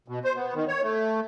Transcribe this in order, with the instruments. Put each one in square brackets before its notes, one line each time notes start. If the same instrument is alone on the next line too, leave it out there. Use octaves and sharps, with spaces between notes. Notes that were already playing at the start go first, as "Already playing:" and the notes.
[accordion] B2
C5
B3
D#3
C#5
A3